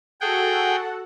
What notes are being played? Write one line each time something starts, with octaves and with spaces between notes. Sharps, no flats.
F#4 G#4 A4 F#5 G5